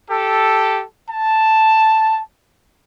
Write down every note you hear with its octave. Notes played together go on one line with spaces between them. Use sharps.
G4 A4
A5